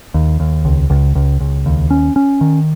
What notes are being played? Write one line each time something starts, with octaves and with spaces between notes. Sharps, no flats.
D#2
D#2
C#2
C#2
C#2
C#2
D#2
C#4
C#4
D#3